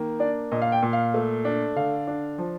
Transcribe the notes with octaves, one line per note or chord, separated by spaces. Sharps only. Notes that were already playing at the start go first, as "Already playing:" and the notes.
Already playing: D#3 A#3
D4 D5
A#2 D#5
F5
G5
A#2
F5
A3
D4
D3 F5
D4
F3